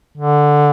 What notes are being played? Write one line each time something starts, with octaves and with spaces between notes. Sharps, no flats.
D3